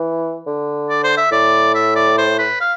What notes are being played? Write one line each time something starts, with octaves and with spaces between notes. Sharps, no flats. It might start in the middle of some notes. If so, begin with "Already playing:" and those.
Already playing: E3
D3
D5
C5
E5
A2 D5
E5
D5
C5
B4
F5